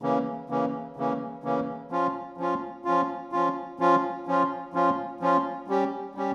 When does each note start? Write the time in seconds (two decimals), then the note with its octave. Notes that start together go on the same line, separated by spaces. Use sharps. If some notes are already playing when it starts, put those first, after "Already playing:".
0.02 C#3 E3 A#3 C#4
0.49 C#3 E3 A#3 C#4
0.96 C#3 E3 A#3 C#4
1.43 C#3 E3 A#3 C#4
1.91 F3 C#4 F4
2.37 F3 C#4 F4
2.85 F3 C#4 F4
3.32 F3 C#4 F4
3.79 F3 C#4 F4
4.27 F3 C#4 F4
4.74 F3 C#4 F4
5.20 F3 C#4 F4
5.67 G3 C#4 G4
6.15 G3 C#4 G4